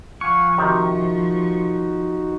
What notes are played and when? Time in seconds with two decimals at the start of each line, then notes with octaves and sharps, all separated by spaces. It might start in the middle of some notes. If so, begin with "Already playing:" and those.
0.21 F3 F5 F#5 G#5 C#6
0.58 C3 D#3 D#4 F#4 C5